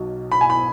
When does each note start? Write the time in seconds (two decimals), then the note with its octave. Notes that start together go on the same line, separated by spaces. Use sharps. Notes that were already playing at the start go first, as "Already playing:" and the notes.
Already playing: B1 B2 F#3
0.32 B5
0.41 G#5
0.50 B5